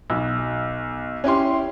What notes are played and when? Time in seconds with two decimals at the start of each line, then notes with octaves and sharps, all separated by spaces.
0.10 B1
1.24 C#4 E4 G4 C6